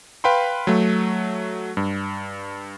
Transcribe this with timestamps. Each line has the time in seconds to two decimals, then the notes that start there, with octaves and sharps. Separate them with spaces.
0.24 B4 F5 G5 B5 C6
0.67 F#3 A3
1.77 G2